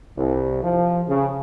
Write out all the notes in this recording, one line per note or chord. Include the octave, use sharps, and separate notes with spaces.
C2
F3
C#3